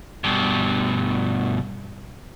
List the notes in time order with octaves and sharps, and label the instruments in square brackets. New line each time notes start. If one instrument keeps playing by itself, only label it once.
[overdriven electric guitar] G2 B2